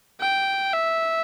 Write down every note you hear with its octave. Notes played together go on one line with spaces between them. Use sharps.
G5
E5